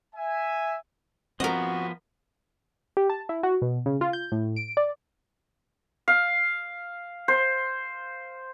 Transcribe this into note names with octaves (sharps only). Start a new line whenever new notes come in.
E5 G#5
F3 B3 C4 F#4 A#4 D#5
G4
A5
E4
F#4
B2
C#3
F4
G6
A2
D7
D5
F5
C5